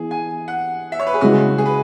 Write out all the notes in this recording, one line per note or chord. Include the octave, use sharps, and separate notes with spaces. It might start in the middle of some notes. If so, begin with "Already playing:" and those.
Already playing: E3 B3 E4 G#4
G#5
F#5
E5
C#5
B4
G#4
C#3 G#3 E4 F#4
G#4
B4